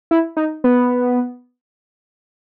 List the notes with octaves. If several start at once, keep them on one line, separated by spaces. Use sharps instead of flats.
E4
D#4
B3